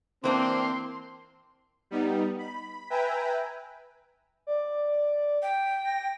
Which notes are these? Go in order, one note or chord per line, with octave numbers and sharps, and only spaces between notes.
E3 A#3 C4 D4 C6
G3 B3 D#4
B5
B4 E5 G5 G#5 A#5 B5
D5
G5
A#6